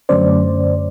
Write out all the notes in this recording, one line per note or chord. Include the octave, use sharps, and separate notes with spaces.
F#2 D3 F#3 A3 C#4 C5 D5